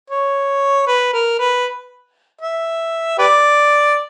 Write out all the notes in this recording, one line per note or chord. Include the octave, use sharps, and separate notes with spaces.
C#5
B4
A#4
B4
E5
G4 B4 D5